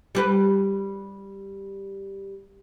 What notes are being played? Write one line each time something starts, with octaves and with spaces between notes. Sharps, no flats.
G3 G4 B4